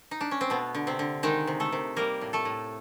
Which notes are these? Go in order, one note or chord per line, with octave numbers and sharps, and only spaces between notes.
D#4
D4
C#4
C4
B2 A3 B3
D3
C3 C4
D3
D#3 G#3 D#4
C3
A3 A4
C3
G3 A#3 A#4
A2
A3 A4
A2